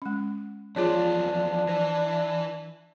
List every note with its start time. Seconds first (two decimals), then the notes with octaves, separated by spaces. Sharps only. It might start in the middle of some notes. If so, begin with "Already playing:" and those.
0.02 G#3 C#4
0.76 E2 F3 D4 F4 G#4 C#5
1.68 E3 C5